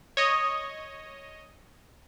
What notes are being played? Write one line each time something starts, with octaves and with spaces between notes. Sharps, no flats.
C#5 D#5